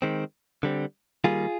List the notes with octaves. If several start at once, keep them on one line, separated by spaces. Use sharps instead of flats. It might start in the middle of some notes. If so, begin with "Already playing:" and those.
D#3 G#3 C4
D3 G3 C4
D#3 G3 A#3 F4 G#4